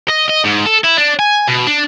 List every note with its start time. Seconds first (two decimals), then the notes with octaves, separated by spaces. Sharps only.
0.10 D#5
0.29 D#5
0.45 G#2
0.66 A4
0.84 E4
0.98 D4
1.19 G#5
1.48 B2
1.67 D4